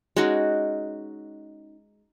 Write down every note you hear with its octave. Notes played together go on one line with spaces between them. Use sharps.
G#3 C#4 D#4 F#4